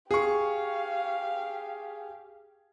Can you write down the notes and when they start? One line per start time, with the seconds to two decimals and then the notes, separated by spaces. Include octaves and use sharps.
0.11 G4 G#4 F5 C#6